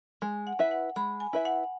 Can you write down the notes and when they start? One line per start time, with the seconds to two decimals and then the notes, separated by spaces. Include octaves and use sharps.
0.22 G#3 G#5
0.47 F#5
0.59 E4 B4 E5
0.71 F#5
0.96 G#3 B5
1.20 G#5
1.33 E4 B4 E5
1.45 F#5